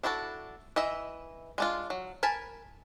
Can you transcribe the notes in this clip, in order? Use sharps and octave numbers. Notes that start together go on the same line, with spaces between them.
D4 E4 F#4 G#4 A4
E3 D#5 E5
G#3 D4 F4
F#3
A#4 G#5 A5 B5